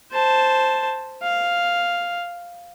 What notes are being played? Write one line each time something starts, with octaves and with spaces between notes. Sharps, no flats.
C5 A5
F5